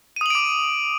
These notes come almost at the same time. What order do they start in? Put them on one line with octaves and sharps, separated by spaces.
D#7 D#6 F#7 D7 D6